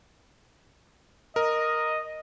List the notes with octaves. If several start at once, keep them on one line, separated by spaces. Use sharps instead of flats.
A#4 D#5